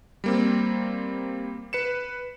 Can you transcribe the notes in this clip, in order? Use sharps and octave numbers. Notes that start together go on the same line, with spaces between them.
G3 A#3 C4
B4 C#7 E7